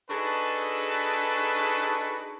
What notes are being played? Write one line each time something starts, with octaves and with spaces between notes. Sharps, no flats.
D4 D#4 F#4 G#4 A4 B4